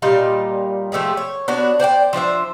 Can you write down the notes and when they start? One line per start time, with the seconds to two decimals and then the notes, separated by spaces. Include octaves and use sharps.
0.02 A#2 G3 D#4 F5
0.92 F3 A3 G4 G#4
1.17 C#5
1.48 B3 D4 F#4 C#5
1.80 C5 D5 F#5 G5
2.13 F3 D4 C5 E5